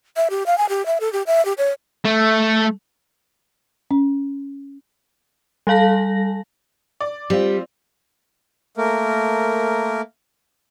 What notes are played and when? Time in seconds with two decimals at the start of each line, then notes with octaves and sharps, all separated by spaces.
0.16 E5
0.30 G4
0.46 F5
0.58 G#5
0.69 G4
0.86 E5
1.00 A4
1.13 G4
1.27 E5
1.45 G4
1.58 C#5
2.05 A3
3.91 C#4
5.67 G3 A4 F5 A5 A#6
7.01 D5
7.30 G3 C4 F4
8.77 A3 A#3 A#4